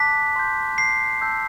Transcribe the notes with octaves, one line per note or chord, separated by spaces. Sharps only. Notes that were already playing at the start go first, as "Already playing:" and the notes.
Already playing: A5 D6 F#6 B6
C6 G6
C7
A5 E6 G6